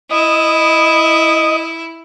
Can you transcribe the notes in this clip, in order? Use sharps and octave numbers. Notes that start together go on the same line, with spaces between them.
E4 D#5